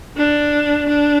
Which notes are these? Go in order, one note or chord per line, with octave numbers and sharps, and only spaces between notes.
D4
D4